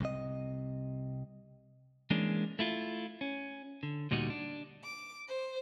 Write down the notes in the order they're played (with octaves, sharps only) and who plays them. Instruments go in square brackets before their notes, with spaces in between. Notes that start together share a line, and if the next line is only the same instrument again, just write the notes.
[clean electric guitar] C2 C3 D#5
E3 G#3 A#3 C#4 D4
A3 E4 F4
C#4
D3
D2 A#2 G3 D#4 F#4
D4
[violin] D6
C5